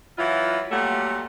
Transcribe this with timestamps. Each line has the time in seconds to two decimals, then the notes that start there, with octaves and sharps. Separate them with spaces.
0.18 E3 F#3 E4 F4
0.71 A#2 F#3 G3 A3 F#5